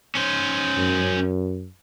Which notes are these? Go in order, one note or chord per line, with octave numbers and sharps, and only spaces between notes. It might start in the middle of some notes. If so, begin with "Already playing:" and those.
C#4 C5
F#2